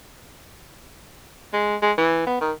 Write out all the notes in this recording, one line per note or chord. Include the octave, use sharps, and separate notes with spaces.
G#3
G#3
E3
B3
D#3